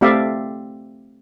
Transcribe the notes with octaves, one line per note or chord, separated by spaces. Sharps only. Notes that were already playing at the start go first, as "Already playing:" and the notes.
A3 C4 G4 D5 E5 F5